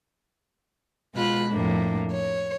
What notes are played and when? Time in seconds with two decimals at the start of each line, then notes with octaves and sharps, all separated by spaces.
1.15 B2 G#3 F4 B5 F#6
1.51 F2 A2 A#3 D4
2.11 C#5